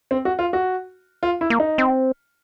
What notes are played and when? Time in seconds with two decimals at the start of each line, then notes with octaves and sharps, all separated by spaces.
0.11 C4
0.25 F#4
0.39 F4
0.53 F#4
1.23 F4
1.41 E4
1.50 A#3
1.60 D#4
1.78 C4